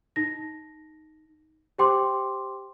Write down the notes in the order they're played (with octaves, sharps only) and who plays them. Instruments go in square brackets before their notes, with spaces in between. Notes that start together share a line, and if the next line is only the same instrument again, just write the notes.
[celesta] D#4 A#6
G4 C5 G5 C6 D6